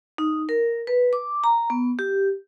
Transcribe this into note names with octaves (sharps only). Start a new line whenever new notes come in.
D#4
A#4
B4
D6
A#5
B3
G4